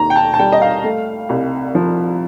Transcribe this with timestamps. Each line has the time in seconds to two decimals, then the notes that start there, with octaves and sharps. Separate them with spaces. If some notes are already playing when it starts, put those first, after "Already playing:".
Already playing: D#2 A#5
0.10 G5
0.16 A5
0.34 A5
0.39 G3 G5
0.52 D#5
0.62 F5
0.84 A3
1.29 C2
1.75 F3